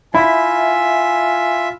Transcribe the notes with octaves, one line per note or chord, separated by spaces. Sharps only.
E4 F4 E5 G#5 B5